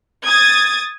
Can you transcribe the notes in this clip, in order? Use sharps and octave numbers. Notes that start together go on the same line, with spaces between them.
D#6 G#6 A6